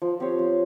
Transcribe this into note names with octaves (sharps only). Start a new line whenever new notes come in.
F3
C4 G4 C#5
F3